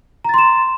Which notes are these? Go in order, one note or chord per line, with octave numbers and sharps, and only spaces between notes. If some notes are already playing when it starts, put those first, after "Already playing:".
A#5 C6 A6 E7